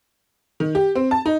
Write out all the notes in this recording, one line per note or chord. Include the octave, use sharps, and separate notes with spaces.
D#3
G4
C4
A5
D#4